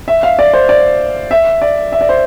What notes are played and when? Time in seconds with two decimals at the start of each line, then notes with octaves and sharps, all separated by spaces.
0.08 E5
0.23 F5
0.39 D5
0.54 C5
0.69 D5
1.31 E5
1.62 D5
1.92 E5
2.01 D5
2.09 C5